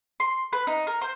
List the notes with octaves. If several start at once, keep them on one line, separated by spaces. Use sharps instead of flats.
C6
B4
D#4
A#4
C5